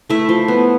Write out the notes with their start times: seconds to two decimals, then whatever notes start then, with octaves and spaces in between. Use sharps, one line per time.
0.10 A3 E4 E5
0.29 F3
0.48 B3